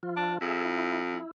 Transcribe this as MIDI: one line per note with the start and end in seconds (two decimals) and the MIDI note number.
0.03 0.38 53
0.03 0.38 65
0.16 0.35 62
0.41 1.17 41
0.41 0.63 68
0.41 0.63 76
0.65 1.03 64
1.14 1.31 64